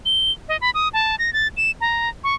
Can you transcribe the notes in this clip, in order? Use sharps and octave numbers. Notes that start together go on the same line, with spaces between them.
G7
D#5
B5
D#6
A5
A#6
A6
E7
A#5
C#6